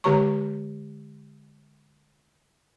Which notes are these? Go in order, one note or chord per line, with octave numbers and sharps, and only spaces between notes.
D3 G#3 G4 C#5 A#5 C#6